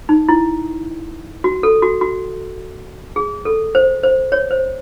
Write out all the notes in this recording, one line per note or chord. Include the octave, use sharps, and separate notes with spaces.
D#4
E4
F#4
A4
F#4
F#4
G#4
A4
C5
C5
C#5
C5